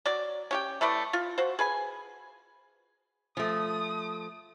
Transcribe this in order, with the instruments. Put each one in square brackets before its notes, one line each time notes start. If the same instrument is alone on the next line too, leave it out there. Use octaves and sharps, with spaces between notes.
[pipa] F#3 D5
C#4 G4 G5
E3 A3 B4 D5
F4
F#4 C5
G#4 B4 G#5
[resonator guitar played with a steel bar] F3 A3 [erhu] D#6